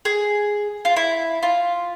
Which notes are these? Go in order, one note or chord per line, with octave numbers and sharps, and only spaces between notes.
G#4
F4
E4
F4